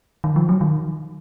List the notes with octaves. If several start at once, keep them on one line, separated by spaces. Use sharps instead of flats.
D#3
F3
F#3
D#3